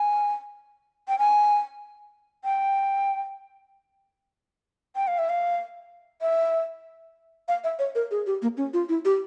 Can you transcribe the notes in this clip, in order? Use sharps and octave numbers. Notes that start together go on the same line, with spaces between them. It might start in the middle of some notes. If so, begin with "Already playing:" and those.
Already playing: G#5
G5
G#5
G5
G5
F5
E5
F5
E5
F5
E5
C#5
A#4
G#4
G4
A#3
C#4
F4
E4
G4